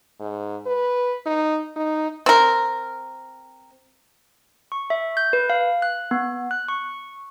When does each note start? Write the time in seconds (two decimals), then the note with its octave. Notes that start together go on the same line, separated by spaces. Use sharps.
0.20 G#2
0.66 B4
1.26 D#4
1.76 D#4
2.26 C4 A#4
4.72 C#6
4.90 E5
5.17 G6
5.33 B4
5.50 F5
5.82 F#6
6.11 B3
6.51 F#6
6.68 C#6